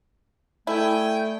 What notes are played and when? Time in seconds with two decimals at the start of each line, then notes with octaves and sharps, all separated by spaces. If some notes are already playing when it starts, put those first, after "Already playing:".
0.67 A3 E4 A4 D5 G5 G#5